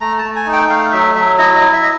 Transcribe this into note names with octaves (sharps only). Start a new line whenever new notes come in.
A3 A#5
A5
A3
G#5
D#4
G5
A3 F5
F#3 E5
F#3 E5
E4 D#5
D#5
E4
E5
D#5